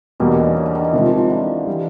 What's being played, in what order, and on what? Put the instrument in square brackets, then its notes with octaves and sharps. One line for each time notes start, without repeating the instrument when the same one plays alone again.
[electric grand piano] E2 B2 G3 A#3 [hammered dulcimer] D#3
[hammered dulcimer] D3
C#3
C#3
D3
D#3
E3
[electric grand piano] C3 D#3 G#3 [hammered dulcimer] F3
[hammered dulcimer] F3
E3
D3
[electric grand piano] E3 G3